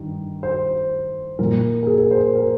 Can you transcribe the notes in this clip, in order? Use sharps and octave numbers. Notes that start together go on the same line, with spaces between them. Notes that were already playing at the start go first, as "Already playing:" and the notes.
Already playing: G2 D#3
C5
A#2 F3 A#4
A#4
G#4
A#4
C5
A#4